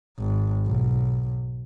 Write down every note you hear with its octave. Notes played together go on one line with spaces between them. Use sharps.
G#1
B1